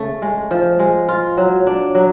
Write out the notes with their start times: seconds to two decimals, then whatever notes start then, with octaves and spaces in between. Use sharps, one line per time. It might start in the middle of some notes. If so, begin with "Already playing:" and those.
Already playing: C#3 A3
0.22 G#3
0.51 F3
0.79 G#3
1.08 F4
1.37 F#3
1.67 D4
1.95 F#3